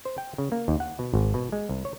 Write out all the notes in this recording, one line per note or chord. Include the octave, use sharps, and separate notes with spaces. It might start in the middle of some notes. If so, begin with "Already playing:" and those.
C5
G5
C#3
A#3
D#2
F#5
B2
G#1
B2
G#3
C2
C#5